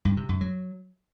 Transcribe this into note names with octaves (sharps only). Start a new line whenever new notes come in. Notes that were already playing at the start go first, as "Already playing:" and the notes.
G2
C3
F#2
F#3